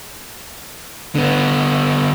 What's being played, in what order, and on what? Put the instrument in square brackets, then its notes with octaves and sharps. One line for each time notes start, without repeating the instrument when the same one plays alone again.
[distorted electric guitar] D3 B3